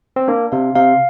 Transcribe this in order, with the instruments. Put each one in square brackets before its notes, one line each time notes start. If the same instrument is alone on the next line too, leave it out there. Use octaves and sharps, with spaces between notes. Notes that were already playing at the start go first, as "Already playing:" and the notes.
[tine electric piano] C4
[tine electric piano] A#3 [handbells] D4
[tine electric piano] C3 [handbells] F5
[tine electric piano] C3 [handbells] F5